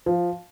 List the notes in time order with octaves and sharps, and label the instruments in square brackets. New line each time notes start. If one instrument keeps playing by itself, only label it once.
[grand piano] F3